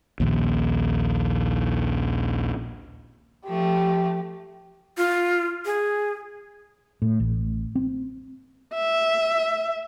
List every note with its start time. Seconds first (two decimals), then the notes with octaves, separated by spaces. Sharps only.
0.20 A#1 D#2
3.48 F3 A3 G4
4.97 F4
5.66 G#4
7.02 A2
7.20 A1
7.75 C4
8.74 E5